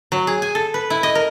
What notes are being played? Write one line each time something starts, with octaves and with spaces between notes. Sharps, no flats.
F#3
G#4
G#5
A4
B4
E4
D#5
A#4